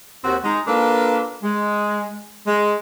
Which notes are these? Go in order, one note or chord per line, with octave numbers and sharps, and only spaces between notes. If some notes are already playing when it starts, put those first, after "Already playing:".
D#2 C4 F#4
G#3 D#4
A#3 D4 F4 A4 B4
G#3
G#3